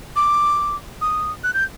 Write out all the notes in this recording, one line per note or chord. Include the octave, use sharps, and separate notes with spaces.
D6
D#6
F#6
G6